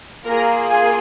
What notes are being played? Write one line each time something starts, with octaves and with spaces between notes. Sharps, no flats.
A#3 F4 G#4 A#4 A#5
G#4 G#5